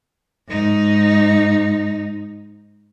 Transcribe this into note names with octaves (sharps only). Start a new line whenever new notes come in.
G#2 D#4